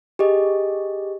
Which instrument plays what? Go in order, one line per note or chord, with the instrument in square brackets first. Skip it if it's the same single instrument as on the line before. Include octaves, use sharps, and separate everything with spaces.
[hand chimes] G4 G#4 D#5